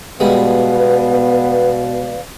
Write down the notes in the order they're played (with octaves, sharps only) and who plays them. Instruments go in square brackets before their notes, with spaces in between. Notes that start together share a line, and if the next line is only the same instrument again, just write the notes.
[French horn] B2 [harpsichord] G3 G#3 [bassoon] B3 [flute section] B4 D5 F5